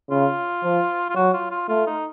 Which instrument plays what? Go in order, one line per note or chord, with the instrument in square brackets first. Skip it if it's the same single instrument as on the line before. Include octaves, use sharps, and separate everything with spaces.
[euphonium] C#3 [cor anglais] F4
[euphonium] F3
[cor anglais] F4
[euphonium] F#3 [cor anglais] F#4
[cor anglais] F4
F4
[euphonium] A3 [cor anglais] F4
[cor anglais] D#4